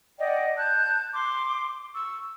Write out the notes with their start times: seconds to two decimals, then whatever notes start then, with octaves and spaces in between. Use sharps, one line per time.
0.19 D5 D#5 F#5 G5
0.57 A5 F#6 G6
1.14 C6 D6
1.93 C#6 E6